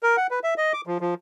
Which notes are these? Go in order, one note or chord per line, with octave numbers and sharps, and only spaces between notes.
A#4
F#5
B4
E5
D#5
D6
F3
F3